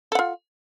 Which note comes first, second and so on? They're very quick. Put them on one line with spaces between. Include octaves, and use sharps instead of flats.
A4 F#5 F4